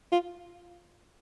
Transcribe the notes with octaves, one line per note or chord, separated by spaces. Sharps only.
F4